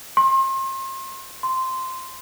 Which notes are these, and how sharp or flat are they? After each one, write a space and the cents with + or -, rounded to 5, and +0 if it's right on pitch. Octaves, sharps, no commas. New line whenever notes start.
C6 +35
C6 -10